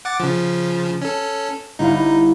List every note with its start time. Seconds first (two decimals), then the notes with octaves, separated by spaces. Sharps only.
0.05 F#5 D6 A6
0.20 C#3 F3
1.02 C#4 A4
1.79 G1 D#4 E4 F5